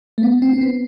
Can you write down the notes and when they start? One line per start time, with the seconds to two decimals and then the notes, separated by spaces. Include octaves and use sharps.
0.18 A3
0.23 B3
0.42 C4
0.53 C4
0.61 B3